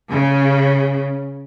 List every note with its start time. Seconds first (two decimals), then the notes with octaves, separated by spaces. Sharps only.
0.10 C#3